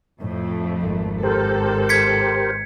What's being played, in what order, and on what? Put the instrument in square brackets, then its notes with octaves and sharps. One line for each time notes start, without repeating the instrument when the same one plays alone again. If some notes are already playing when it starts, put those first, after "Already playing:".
[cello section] F2 A3 [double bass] A2
[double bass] G#1
[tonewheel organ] G4 A#4 C5 [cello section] A4
[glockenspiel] G#6 B6 C#7